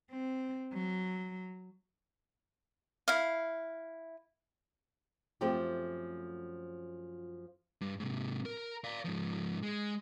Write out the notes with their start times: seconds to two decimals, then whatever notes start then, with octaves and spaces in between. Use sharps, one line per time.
0.10 C4
0.73 F#3
3.08 E4 F5
5.41 F#2 F3 A3 C4 F4 G4
7.81 G2
8.00 G#2 C3
8.45 A#4
8.84 D5 F5
9.05 G#2 F3
9.63 G#3